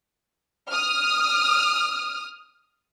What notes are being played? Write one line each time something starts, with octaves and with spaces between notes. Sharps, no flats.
D#6 F6